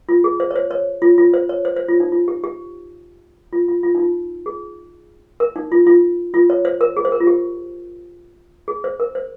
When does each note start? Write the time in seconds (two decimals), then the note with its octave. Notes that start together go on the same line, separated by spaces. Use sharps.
0.09 F4
0.24 G#4
0.40 C5
0.51 C#5
0.56 C5
0.71 C#5
1.02 F4
1.18 F4
1.34 C5
1.49 C#5
1.65 C5
1.76 C5
1.88 F4
2.00 D#4
2.12 F4
2.28 G4
2.44 G4
3.53 F4
3.68 F4
3.83 F4
3.95 D#4
3.99 F4
4.46 G#4
5.40 A#4
5.56 D#4
5.72 F4
5.87 F4
6.34 F4
6.50 C#5
6.65 C5
6.81 A#4
6.97 G#4
7.05 C5
7.12 A#4
7.20 F4
7.27 G4
8.68 G#4
8.84 C5
9.00 A#4
9.15 C5